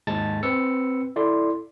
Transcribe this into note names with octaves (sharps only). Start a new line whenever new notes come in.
D#2 G#2 G#3 A5 A6
C4 B4 E6 C#7
E4 A4 D5 C6